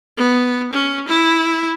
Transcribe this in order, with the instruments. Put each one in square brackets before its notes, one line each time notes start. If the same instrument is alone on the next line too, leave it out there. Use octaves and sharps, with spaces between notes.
[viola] B3
C#4
E4